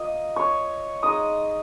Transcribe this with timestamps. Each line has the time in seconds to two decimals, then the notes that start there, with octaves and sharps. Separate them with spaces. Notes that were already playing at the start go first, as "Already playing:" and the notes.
Already playing: A#3 F4 D#5
0.36 C#5 C#6
1.03 G#3 D#4 D#5 D#6